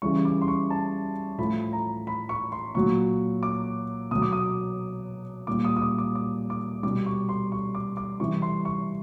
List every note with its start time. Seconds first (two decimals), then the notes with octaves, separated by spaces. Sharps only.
0.02 C#3 E3 G3 C#6
0.25 D6
0.41 C6
0.48 C#6
0.70 A5
1.38 A2 F3 B5
1.73 A#5
2.07 B5
2.29 C#6
2.52 C6
2.75 A#2 F#3 C#6
3.43 D6
4.11 B2 F#3 D#6
4.22 D6
4.32 D#6
5.47 A#2 G3 D6
5.65 D#6
5.76 D#6
5.82 D6
5.98 D6
6.15 D6
6.50 D6
6.83 B2 G3 D6
7.06 C#6
7.29 C6
7.52 C#6
7.75 D6
7.97 D6
8.20 C3 E3 G3 C#6
8.42 C6
8.65 C#6